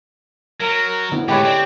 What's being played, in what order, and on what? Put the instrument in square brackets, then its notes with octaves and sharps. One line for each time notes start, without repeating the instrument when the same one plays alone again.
[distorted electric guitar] F#3 [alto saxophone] A#4
[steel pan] D3 B3 E4
[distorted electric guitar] A2 C3 [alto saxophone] G#3 [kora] G4 B4 C#5
[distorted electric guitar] C4 [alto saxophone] D5